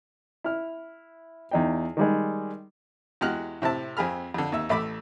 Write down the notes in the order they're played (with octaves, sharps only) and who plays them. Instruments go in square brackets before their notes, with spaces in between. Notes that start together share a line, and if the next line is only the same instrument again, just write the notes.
[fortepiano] E4 F6
E2 D#4 G5
D#3 G3 G#3
E2 G#3 F#4 G4 F6 F#6
A2 C3 E4 A5
F2 C4 G#4 B5 F6
F2 D3
D#2 E5
A1 A3 B5 D6 E6